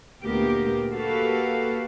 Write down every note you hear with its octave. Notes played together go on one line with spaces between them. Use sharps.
D2 A#2 A#3 B3 G4 A#4
A#3 F#4 G4 A4 B4 F5